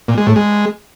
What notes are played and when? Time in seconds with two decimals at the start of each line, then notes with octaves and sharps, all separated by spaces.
0.08 A#2
0.18 G#3
0.27 A2
0.36 G#3